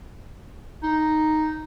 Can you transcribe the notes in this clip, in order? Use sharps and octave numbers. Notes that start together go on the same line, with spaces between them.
D#4